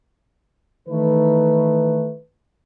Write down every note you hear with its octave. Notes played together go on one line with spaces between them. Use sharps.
D#3 E3 A3 D#4 B4